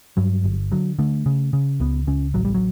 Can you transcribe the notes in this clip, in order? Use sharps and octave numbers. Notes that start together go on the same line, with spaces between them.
G2 F#3
G1
D3 F#3
D3 A3
C#3
C#3
C#2 B3
C#2 C#4
A1 F#3
G3
F#3